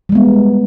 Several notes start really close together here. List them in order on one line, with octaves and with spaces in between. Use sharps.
G3 G#3 B3